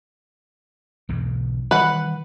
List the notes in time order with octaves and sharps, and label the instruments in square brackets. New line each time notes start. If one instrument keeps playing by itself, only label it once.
[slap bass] B1 E2 G#2
[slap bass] D#3 E3 G3 [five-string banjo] B4 F#5